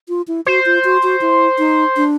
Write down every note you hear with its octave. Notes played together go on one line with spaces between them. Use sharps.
F4
E4
F#4 C5
F4
F#4
F#4
E4
D#4
D4